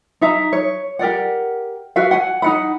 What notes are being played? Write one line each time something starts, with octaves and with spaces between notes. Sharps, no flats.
D#4 E5 A#5
C#5
G4 A#4 D5 F#5
F#4 B4 E5 F5
F#5 G#5
D#4 F#5 B5